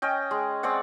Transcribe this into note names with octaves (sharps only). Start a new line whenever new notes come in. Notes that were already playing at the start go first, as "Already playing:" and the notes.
C#4 D#5 G5
G#3
G#3 C4 D5 F#5